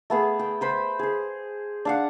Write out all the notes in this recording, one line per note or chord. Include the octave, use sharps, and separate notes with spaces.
A3 B3 G#4
G5
B4 C5 B5
G#4 C5
D4 F5 F#5